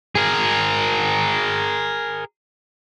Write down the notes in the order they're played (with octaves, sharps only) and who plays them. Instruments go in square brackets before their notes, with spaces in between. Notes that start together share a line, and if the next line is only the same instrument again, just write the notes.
[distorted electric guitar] G#4 A#4